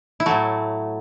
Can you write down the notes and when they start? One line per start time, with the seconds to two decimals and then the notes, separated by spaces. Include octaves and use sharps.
0.20 E4
0.26 A2 F#3 A3 F#4